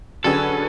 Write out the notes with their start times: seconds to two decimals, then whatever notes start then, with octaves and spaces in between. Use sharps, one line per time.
0.24 D3 F#3 C#4 G#4 A4 B4